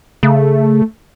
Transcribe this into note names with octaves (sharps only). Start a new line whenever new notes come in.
C#3 A3